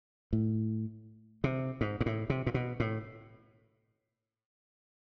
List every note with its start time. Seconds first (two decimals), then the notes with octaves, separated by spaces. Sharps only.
0.33 A2
1.44 C3
1.81 G#2
2.01 G#2
2.06 A2
2.30 C3
2.47 A#2
2.54 B2
2.80 A2